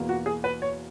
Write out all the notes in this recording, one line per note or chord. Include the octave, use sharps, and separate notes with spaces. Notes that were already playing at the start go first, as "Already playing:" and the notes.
Already playing: E2 B2 A#3
F#4
G#4
B4
C#5